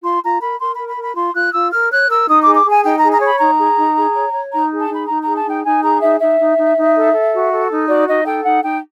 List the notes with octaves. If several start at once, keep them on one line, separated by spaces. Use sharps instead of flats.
F4 C6
F4 A#5
A#4 B5
A#4 C6
A#4 B5
B5
A#4
B5
F4 C6
F4 F#6
F4 E6
A#4 F6
C#5 F#6
A#4 E6
D#4 D#6
G#4 D6
D6
G#4 G#5
D#4 G5
G#4 A#5
A#5
C#5
B5
D#4 A#5
G#4
D#4
G#4
C#5
C#5
D#4 A#5
G#4
A5
D#4
B5
D#4 A#5
G#4 A#5
A5
D#4 G5
D#4 G#5
G#4 A#5
D#4 E5
D#4 E5
D#4
D#4
D#4
A4
A4
F#4
A4
D#4
F#4 D5
D#4 D#5
A4 G5
D#4 F#5
D#4 G5